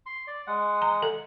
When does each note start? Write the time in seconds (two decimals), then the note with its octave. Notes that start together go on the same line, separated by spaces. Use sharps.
0.06 C6
0.27 D5
0.47 G#3 F#5
0.82 A#5
1.02 A4